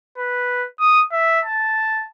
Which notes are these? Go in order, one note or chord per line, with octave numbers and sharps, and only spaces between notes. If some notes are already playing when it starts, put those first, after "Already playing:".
B4
D#6
E5
A5